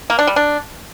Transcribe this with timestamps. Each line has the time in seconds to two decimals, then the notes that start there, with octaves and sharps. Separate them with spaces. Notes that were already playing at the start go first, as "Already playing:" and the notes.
0.10 A#3
0.19 D4
0.27 G3
0.36 D4